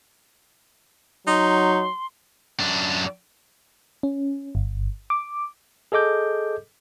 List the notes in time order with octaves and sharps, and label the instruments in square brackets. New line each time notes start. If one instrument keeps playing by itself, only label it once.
[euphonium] F#3 [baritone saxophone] D#4 [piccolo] C6
[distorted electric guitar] F#2 D4
[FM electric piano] C#4
G1
D6
[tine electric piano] G#4 A4 D#5 D6 G6